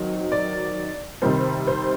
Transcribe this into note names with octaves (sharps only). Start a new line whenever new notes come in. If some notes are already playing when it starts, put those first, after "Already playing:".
Already playing: D#3 F#3 C4 D#4
D5
C3 D#3 G3 C5
C5